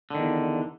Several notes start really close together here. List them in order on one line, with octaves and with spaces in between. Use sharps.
D3 D#3 E2